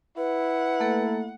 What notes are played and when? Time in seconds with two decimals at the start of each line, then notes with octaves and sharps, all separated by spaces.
0.17 E4 B4 F#5
0.80 A3 A#3 A4